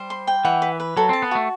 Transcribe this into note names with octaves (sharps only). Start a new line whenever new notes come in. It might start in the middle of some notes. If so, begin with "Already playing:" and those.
Already playing: G3 C5
C6
G5
E3 F#5
B4
B4
F#3 A4
C4 A5
B3
A3 F#4